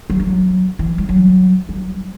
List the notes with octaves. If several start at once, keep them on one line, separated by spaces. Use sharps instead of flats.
F#3
F#3
E3
G3
F#3
G3